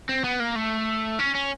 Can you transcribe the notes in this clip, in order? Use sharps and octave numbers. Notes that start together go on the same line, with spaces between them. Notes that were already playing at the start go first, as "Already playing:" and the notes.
C4
B3
A#3
A3
C#4
C#4